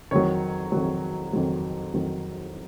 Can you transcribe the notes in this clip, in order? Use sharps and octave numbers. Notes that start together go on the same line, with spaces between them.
F2 D#3 F#3 C#5
F2 D#3 F#3
F2 D#3 F#3
F2 D#3 F#3